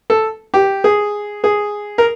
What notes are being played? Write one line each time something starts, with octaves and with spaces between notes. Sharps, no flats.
A4
G4
G#4
G#4
A#4